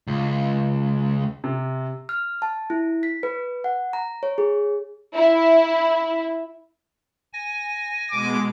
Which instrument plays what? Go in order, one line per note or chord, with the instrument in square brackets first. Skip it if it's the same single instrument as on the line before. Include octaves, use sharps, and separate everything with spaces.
[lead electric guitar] C#2
[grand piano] C3
[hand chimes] F6
A5
E4
B6
B4
F#5
A#5
C#5
G#4
[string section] E4
[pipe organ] G#5 A#6
[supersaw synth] B2 G#3 [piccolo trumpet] D6